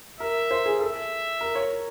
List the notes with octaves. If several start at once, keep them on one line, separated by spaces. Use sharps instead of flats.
A#4 E5
C5
G#4
A4 E5
A#4
C#5